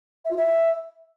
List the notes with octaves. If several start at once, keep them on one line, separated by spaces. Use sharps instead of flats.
E5
F4
E5